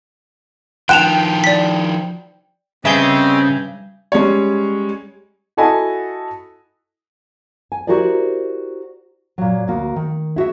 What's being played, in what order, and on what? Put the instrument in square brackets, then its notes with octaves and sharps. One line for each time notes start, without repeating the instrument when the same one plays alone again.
[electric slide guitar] D#3 F3 [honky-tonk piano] G5 [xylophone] F#6 E7 F7
[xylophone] D5 B6
[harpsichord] G2 [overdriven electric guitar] C#3 [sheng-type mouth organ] C4 G#4 D#5 [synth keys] E5 G#5 G6
[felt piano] G3 G#3 C#4 C#5
[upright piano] E4 F#4 A4 D#5 G#5 B5
[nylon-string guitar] G#5
E4 F#4 G4 A#4 C5 D5
A#2 F#3
D2 A#3 F#4
D#3
E4 F#4 G#4 E5